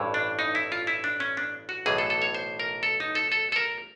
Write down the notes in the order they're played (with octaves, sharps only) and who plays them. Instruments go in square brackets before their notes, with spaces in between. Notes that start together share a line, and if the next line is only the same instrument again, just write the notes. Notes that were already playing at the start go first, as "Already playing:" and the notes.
Already playing: [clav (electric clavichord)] A1 G2 E3
D4
D#4
E4
F4
E4
D4
C#4
D4
F#4
B1 A2 E3 G#4
A4
A4
C#5
C5
A#4
A4
D#4
A4
A4
A4
A#4